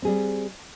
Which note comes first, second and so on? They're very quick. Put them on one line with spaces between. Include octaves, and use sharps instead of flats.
C4 G#4 G3